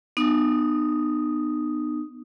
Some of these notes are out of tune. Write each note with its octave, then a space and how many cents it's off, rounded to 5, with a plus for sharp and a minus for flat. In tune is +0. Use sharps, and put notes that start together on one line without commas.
B3 +0 D#4 -40 D#6 +0